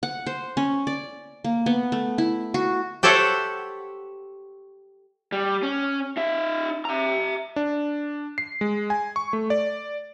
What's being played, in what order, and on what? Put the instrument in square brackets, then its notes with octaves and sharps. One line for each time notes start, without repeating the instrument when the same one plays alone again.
[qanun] F#5
C5
C#4
D5
A#3
B3
A3
E4
F#4
[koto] G4 A4 C5 C#5 E5 F#5
[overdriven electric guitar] G3
C#4
D#4 E5
E5 A#5
[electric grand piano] D4
C7
G#3
G#5
C#6
A3
D5